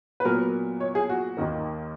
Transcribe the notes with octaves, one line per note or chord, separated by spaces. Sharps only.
B4
A#2 F#3 B3 A#4
C#5
G#4
F#4
D#2 D#3 A#3